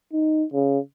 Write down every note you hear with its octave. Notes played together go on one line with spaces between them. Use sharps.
D#4
C#3